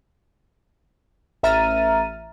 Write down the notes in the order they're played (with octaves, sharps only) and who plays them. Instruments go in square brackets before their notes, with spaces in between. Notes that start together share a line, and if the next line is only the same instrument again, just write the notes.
[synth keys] A1 E5 A#5 F6 A6 D#7